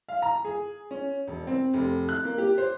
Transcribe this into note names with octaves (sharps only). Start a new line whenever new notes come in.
F5
A#5
G#4
C#4
E1
C4
F1
F#6
A#3
G4
C5